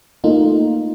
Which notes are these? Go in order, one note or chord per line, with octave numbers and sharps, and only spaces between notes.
A3 A#3 D#4 F4